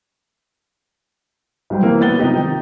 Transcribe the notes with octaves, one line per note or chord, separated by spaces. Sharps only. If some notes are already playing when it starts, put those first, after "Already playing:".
B1 F#3 G3 C5
C3 E3 A#3
F#1 B3 A6 G7
C3 F3 D#4 G4
D#3